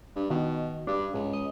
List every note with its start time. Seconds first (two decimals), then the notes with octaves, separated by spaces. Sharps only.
0.16 G2
0.30 B2 D#3
0.87 G2 D4
1.14 C#2 G#2
1.33 D#5